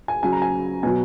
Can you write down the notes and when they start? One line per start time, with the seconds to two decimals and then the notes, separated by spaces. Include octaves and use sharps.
0.08 G#5
0.23 C#3 F#3 G#5
0.32 A#5
0.42 G#5
0.83 B2 F#3 G#5